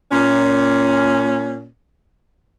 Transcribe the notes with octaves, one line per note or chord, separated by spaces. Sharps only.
A#2 C#4